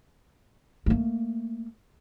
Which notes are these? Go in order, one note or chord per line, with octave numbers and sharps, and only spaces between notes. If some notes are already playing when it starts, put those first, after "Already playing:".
A3 A#3